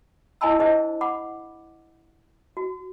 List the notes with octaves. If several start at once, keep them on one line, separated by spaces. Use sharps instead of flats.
E4 D#5 G#5 A5 B5 E6
D4 E4 G#4 C5 D#5
F#5 B5 D6
F#4